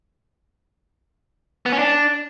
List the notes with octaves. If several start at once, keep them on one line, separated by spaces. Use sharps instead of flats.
B3
C#4
D4